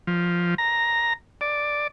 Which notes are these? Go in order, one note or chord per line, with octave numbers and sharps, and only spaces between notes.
F3
A#5
D5